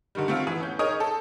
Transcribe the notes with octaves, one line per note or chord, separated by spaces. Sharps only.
D3 D#3 G3
A3 C4 F4
E3 B3
C#4 G6
D#4 G#4 A#4 C#5 D#5 D#6
A4